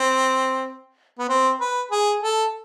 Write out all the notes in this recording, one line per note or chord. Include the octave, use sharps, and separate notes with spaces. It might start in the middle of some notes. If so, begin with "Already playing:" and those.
Already playing: C4
B3
C4
B4
G#4
A4